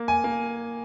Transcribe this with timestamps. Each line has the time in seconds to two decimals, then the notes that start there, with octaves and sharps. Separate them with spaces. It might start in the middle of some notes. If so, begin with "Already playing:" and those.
Already playing: A#3
0.08 G#5
0.24 A#3